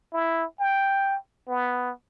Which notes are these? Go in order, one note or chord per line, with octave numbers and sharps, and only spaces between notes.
E4
G5
B3